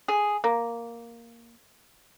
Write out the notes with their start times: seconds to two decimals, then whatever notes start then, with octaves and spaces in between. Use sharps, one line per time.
0.08 G#4
0.44 A#3